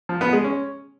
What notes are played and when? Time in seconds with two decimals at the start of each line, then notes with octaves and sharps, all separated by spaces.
0.09 F3
0.21 B3
0.33 G#3
0.44 C#4